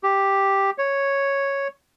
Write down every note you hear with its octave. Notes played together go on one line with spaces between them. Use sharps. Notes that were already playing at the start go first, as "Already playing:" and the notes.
G4
C#5